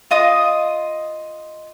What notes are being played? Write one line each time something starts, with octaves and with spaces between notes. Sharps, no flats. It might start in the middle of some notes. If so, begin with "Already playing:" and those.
F4 D#5 D#6